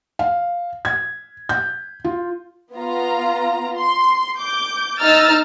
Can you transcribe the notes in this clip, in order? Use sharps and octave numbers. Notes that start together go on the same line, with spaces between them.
F5
G#6
G6
F4
B3 F4 A#5
C6
D6 G6
D#4 D#5 A#5 E6 F6 A6